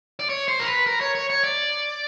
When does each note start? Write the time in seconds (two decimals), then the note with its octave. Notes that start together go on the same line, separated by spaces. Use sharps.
0.19 D5
0.29 C#5
0.48 C5
0.60 A#4
0.67 B4
0.86 A#4
1.01 C#5
1.15 C#5
1.30 C#5
1.44 D5